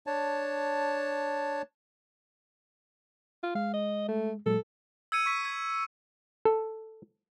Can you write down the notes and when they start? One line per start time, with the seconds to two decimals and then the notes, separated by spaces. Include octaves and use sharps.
0.07 D4 C#5 A5
3.43 F4
3.55 G#3 F5
3.73 D#5
4.08 A3
4.46 A#2 F#3 G#3 A4
5.12 E6 G#6 C#7 D#7
5.26 C#6 B6
5.45 G#6
6.45 A4